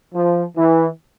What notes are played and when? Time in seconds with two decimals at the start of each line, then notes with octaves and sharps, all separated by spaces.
0.15 F3
0.57 E3